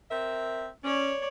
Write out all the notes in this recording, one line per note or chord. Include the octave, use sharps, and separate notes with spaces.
C4 A#4 E5
C#4 C#5 D5